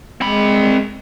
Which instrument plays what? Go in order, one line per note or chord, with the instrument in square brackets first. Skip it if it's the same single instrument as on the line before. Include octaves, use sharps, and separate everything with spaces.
[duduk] G#3 [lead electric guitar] C4 B5